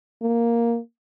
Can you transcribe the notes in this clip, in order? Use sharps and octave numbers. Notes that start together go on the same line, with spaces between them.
A#3